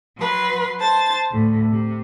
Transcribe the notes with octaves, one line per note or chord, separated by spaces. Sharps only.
F#3 B4 C6
C5 A5 A6
D2 A2
C3